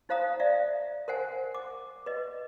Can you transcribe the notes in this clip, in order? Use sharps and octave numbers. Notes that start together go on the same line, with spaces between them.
D#4 C5 F5 A#5 D#6
D5 E5 F5
A#4 C5 F#5 G#5
D6
B4 D#5